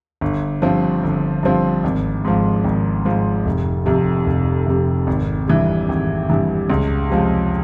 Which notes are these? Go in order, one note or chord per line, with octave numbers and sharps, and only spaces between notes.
G1
G2 F3 C4
G1
G2 F3 C4
G#1
G#2 F3
G#1
G#2 F3
F1
F2 C3
F1
F2 C3
G#1
G2 E3 G3
G#1
G2 E3 G3
C#2
C3 F3 G#3